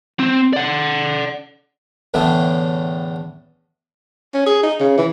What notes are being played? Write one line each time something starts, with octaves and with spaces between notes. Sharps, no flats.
C4
D5 F#5
E2 A2 D3 A3 B3
C#4
G#4
D#4
C#3
E3